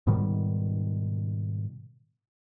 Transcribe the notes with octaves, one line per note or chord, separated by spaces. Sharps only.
G#2 B2 D#3 G3